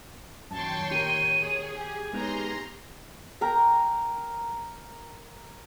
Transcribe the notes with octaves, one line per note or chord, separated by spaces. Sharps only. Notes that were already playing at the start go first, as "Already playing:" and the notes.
F#2 A#2 D#3 C#5 G5 A5 C6 C#6
G4 A#4 D#7
G#4
G4 G#5
G#3 B3 D#4 G4 A#4 C#5 A#5 C6
A#4 G5 A#5